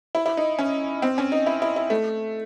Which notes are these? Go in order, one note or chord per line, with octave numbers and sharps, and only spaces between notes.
E4
E4
D#4
C#4
C4
C#4
D#4
E4
E4
E4
A3